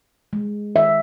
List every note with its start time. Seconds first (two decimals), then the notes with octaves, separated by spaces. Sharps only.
0.33 G#3
0.76 D#3 E5